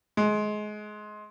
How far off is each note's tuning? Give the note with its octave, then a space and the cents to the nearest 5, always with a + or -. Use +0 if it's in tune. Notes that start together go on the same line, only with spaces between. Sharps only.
G#3 +25